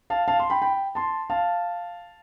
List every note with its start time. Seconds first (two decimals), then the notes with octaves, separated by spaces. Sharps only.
0.10 F5 A5
0.28 F5 A5
0.40 C6
0.50 G5 B5
0.62 G5 B5
0.95 A5 C6
1.30 F5 A5